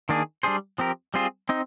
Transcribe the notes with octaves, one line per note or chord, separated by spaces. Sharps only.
D#3 A#3 D4 G#4
G3 D4 G#4 C5
F3 C4 G4 A#4
G3 C4 F4 G#4 C5
C4 D#4